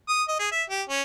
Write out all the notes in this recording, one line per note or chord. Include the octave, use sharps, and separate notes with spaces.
D#6
D#5
G#4
E5
G4
C#4